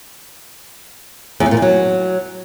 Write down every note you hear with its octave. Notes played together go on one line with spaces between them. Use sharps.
E2
C#3
A#2
E2
F#3